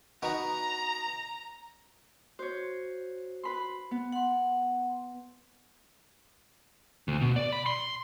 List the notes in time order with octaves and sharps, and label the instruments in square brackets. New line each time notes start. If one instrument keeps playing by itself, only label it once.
[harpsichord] B3 D#4 F#4 [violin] A#5
[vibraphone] F#4 [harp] C5 C#5
[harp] B4 B5 C6
B3
[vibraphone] F#5 C6
[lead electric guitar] D2
B2
D5
B5
C6